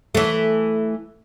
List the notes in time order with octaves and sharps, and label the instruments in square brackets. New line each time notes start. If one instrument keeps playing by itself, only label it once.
[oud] E3 A3